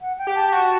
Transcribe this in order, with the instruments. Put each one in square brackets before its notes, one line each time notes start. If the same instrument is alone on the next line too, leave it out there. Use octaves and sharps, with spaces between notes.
[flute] F#5
G5
[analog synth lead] G4
[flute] A5
[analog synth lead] G4
F#4